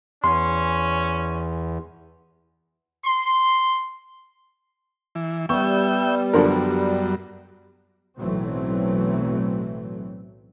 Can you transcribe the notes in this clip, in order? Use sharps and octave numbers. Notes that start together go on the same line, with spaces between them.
E2 C#4 C6
C6
E3
G3 B3 E5 G5 C#6
F#2 D3 F3 A#4
B1 A2 E3 F#3 A3 C4